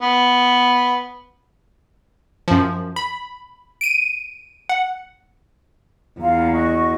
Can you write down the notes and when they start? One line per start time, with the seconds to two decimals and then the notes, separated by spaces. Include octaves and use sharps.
0.02 B3
2.48 F#2 F3
2.96 B5
3.81 D7 D#7
4.69 F#5
6.20 E2 F4 F5 A#5
6.53 F#4 D#5 C#6